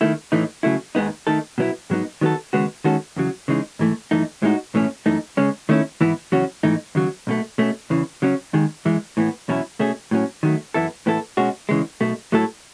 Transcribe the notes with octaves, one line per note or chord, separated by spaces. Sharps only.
D#3 A3 E4
A2 E3 A3 D#4
C#3 F#3 A3 E4
D#2 D#3 G#3 B3 D#4
D#3 A3 D#4 A4
B2 F#3 B3 E4
G#2 F#3 B3 D#4
D#3 F#3 B3 F#4 A4
D#2 C#3 G#3 B3 F#4
D#3 G#3 C#4 F#4 A4
E2 C#3 F#3
C#3 E3 G#3 D#4
G#2 E3 A3
F#2 E3 A3 D#4
A2 G#3 D#4 F#4
B1 A2 E3 A3 C#4
F#2 E3 A3 D#4
C#2 C#3 G#3 C#4
D#3 A3 C#4 E4
G#2 E3 B3 E4
E2 C#3 F#3 C#4 F#4
G#2 E3 A3 D#4
D#2 C#3 F#3
B1 B2 A3
B2 A3 C#4
E2 C#3 E3
C#3 F#3 C#4
D#2 D#3 G#3
F#2 E3 G#3
A2 E3 B3
E2 B2 F#3 C#4 E4
B2 A3 C#4 G#4
A2 F#3 C#4
D#3 F#3 A3
F#2 E3 B3 E4 A4
A2 E3 B3 E4 A4
B2 G#3 C#4 F#4
E2 C#3 E3 G#3
B1 B2 A3
A2 F#3 A3 E4 A4